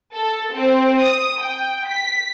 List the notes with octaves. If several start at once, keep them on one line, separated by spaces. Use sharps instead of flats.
A4
C4
D#6
G5
B6